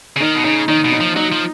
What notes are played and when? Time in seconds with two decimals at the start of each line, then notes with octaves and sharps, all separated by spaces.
0.16 C#3
0.20 D#3 D#4
0.35 B2
0.44 C#3 D#4
0.68 D#3 D#4
0.85 B2
0.92 D#4
1.00 F3
1.16 F#3 D#4
1.32 F3